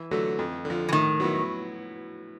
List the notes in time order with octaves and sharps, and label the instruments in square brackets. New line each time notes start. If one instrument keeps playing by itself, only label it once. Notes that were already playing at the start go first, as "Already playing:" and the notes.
Already playing: [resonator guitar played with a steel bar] E3
[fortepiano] D3 F#3 A3
F2
D3
F3
[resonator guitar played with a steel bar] E3
[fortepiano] A2 [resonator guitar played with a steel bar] D#3
[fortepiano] F#3 B3 E4